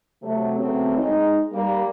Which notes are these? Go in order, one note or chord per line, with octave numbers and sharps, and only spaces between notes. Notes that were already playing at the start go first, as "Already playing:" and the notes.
C3 F#3 A3
C#3 F#3 A3 B3 C4
G#3 D#4
G3 A#3